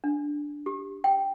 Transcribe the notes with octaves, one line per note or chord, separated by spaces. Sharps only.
D4
G4
G5